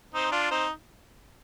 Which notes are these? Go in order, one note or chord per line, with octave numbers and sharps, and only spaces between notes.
C4 D#4
D4 F4
C4 D#4